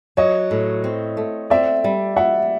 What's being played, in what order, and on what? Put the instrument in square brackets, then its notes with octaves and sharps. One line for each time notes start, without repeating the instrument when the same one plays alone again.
[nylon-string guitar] F#3 [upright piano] C#5 D#5
[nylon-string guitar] A2
C4
A3
[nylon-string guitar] C4 [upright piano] D5 E5
[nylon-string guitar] G3
[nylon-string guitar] G3 [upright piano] E5 F#5